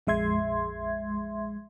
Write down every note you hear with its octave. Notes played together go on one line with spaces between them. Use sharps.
A#1 F2 G#3 E5 C6 G#6